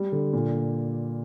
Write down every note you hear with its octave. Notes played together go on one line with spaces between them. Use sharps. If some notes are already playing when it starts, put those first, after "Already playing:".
Already playing: G3
D3
A#2